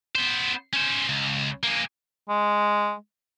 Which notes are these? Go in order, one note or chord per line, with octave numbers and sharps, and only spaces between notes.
B3 C5
C#4 C5
C#2
A#3 G#4
G#3